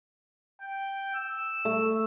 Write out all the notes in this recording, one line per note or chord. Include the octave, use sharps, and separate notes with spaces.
G5
E6
A3